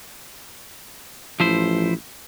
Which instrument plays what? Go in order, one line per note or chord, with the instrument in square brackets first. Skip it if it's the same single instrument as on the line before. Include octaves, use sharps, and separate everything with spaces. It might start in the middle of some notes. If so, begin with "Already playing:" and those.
[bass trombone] A1 [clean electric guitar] F3 E4 C5